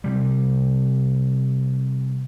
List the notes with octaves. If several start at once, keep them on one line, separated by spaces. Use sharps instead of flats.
C3 G3